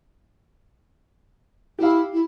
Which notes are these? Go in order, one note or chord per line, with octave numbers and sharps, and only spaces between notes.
E4 G4 F5
E4